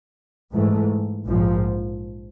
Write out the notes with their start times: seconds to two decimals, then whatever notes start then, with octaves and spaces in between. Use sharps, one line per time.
0.54 G#2 E3 A3
1.27 A#1 G#2 F3